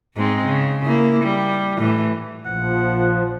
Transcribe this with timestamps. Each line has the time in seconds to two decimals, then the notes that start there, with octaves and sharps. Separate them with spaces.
0.16 G#2 G#3 C4
0.45 C#3
0.85 A#3 E4
1.23 G3
1.78 A2 E3
2.46 A#1 F3 F#5